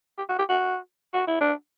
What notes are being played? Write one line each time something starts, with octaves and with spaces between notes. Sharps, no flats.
G4
F#4
G4
F#4
F#4
E4
D4